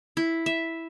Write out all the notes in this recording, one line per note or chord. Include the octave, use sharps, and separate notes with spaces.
E4
E5